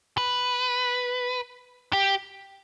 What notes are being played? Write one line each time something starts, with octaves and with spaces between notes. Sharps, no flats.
B4
G4